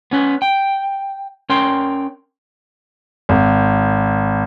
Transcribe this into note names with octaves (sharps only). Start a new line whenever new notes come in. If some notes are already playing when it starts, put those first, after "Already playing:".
B3 C#4 B4
G5
C#4 A#4 G5 C6
G#1